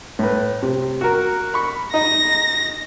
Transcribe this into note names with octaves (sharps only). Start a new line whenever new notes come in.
A2 B4
C3
F#4 A#4
B5 C#6
D#4 A#6